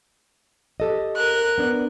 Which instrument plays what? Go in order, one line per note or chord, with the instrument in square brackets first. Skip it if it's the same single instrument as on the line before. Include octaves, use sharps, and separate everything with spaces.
[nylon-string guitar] G4 A4 D#5
[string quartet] A#4 F#6
[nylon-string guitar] B3 D4